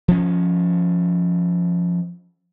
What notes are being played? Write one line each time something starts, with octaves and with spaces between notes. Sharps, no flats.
F3 C#4